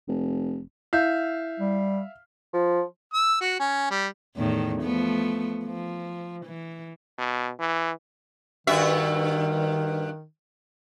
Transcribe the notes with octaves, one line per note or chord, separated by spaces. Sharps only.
F1
E4 E5 F5 G6
G3
F3
E6
F#4
C#4
G3
E2 A2 D#3
F3 A3 B3
F3
E3
B2
E3
G2 D#3 F#4 E5